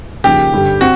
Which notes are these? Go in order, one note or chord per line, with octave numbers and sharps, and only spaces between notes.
D#2 C#3 F3 G4
G2 D3 G3
C4 F#4